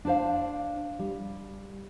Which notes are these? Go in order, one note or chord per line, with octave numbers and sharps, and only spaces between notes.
D4 C5 F5
G3